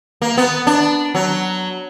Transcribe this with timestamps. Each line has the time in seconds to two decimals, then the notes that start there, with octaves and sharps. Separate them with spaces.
0.22 A#3
0.37 B3
0.67 D4
1.15 F#3